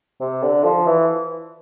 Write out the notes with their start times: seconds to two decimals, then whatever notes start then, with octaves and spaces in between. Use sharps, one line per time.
0.20 C3
0.42 D3
0.64 F3
0.87 E3